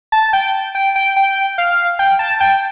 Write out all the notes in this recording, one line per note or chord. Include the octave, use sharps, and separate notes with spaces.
A5
G5
G5
G5
G5
F5
G5
A5
G5